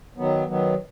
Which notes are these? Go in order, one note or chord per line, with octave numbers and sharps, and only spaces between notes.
D#3 F#3 B3
D#3 F#3 B3